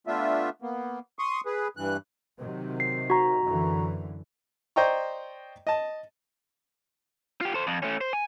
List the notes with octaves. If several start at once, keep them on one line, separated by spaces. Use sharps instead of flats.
A3 B3 D4 F4 E5
A#3 B3
C6 C#6 D#6
G#4 B4
G2 E3 F#6
C3 D#3 F#3
C7
F#4 A#5
F#2 D3 E3
C5 D5 D#5 G5 A#5 C#6
D#5 A5
F4 G4
A4 C5
F2
A3 C#4
C5
G#5